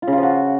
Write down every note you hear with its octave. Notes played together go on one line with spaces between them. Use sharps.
F4
C#3
F4
F3
F#4